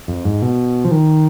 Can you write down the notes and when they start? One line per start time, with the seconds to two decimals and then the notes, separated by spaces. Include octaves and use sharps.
0.08 F2
0.25 G#2
0.42 B2
0.85 F3
0.91 D#3